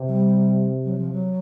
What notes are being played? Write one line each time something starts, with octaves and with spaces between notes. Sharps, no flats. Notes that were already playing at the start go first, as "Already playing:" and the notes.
Already playing: C3
F#3
G3
F#3
F3
F#3